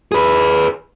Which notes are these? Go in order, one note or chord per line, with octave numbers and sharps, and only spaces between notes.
G#4 B4